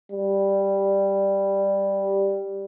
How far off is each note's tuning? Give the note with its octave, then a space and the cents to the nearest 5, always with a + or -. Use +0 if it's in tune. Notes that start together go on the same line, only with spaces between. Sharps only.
G3 +5